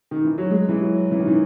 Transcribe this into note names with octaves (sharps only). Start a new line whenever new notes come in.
D#3
E3
F#3
G#3
E3
F#3
E3
D#3
E3